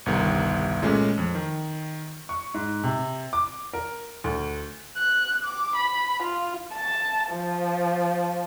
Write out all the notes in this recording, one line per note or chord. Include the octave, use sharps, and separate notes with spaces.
G1 C2 D#3
A#2 G#3 A3 C#4
F2
D#3
C#6
G#2
C3
D6
A#4
D2
F#6
D6
B5
F4
A5
F3